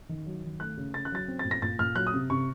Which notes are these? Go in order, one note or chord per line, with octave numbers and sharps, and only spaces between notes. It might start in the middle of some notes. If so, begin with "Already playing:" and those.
D#3
F#3
D#3
A3 F#6
C#3
C#3 A6
F#6
F#3 A6
C4
A6
A#2
A#6
A#2 A6
A#2 F6
F#3 F#6
D#6
C3
C3 C#6